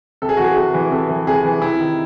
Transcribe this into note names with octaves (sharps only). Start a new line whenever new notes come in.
C3 A4
G#4
E3 F#4
G#4
C3 G#4
E3
C3 A4
E3
C3 G#4
E3
C3 E4
D#3